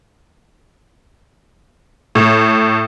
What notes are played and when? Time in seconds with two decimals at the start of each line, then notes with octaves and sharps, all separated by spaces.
2.15 A2